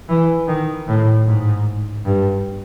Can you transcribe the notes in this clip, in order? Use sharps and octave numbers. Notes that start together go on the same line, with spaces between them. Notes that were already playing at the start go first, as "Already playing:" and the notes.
E3
D#3
A2
G#2
G2